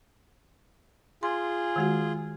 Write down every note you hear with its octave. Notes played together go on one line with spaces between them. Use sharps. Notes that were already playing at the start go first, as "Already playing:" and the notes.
F4 G#4 C6
D#3 G#3 F#4